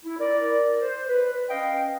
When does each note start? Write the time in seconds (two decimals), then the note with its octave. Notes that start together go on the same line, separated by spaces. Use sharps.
0.04 E4
0.20 A#4 D5
0.80 C5
1.08 B4
1.49 C#4 D#5 F5 G5